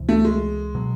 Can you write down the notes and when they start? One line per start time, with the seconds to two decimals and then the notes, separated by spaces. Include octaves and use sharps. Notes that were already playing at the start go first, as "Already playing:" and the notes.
Already playing: C#2 C3 E3
0.09 A3
0.25 G#3
0.75 B2 F#3